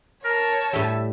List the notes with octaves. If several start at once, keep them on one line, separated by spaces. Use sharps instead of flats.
A#4 C#5 A5
A2 G3 E5